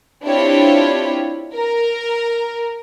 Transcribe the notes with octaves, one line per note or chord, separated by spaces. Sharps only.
C4 D4 E4 F4 G4 C#5
A#4